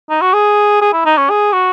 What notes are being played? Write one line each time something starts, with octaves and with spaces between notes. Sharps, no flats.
D#4
F#4
G#4
G#4
E4
D#4
C#4
G#4
F#4